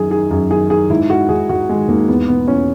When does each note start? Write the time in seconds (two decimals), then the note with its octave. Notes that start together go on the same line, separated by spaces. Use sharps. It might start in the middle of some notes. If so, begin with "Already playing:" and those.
Already playing: F#2 D#3 G#4
0.11 D#3 G#4
0.31 F#2 G#4
0.51 D#3 G#4
0.70 D#3 G#4
0.90 G#2 E4
1.10 G#2 F#4
1.29 G#2 G#4
1.49 G#2 F#4
1.69 D#3 G#3
1.88 G#2 A#3
2.08 E2 B3
2.28 B2 B3
2.48 E2 C#4